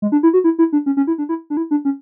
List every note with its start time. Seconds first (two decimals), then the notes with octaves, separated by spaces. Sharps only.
0.02 G#3
0.12 D4
0.23 E4
0.33 F#4
0.44 E4
0.59 E4
0.73 D4
0.86 C#4
0.97 C#4
1.07 E4
1.18 D4
1.29 E4
1.50 D4
1.57 E4
1.71 D4
1.85 C#4